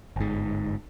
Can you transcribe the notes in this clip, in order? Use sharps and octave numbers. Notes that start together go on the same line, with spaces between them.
G1 G#2